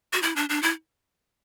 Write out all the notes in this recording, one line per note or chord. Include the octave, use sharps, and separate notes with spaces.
F#4
E4
D4
D4
E4